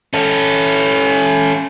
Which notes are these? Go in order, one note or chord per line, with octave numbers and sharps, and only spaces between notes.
C#4 A4